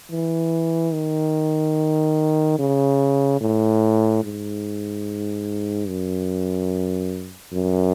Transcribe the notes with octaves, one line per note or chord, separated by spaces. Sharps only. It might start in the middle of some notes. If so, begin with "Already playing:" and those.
E3
D#3
C#3
A2
G#2
F#2
F#2